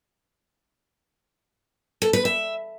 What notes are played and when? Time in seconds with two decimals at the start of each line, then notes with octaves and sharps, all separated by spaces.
2.02 A4
2.13 B4
2.25 E5